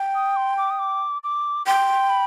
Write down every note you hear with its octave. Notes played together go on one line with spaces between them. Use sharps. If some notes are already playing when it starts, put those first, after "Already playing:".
Already playing: G5
D#6
C6
D6
D#6
D6
D6
G5 C6
B5